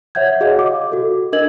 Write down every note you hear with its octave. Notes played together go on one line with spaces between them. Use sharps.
C#5 E5 F#5 G6 G#6
F#4 G#4 C#5 D#5 F5 F#5
D#5 D6
F#4 A4
D4 A#4 D#5 G#6 F#7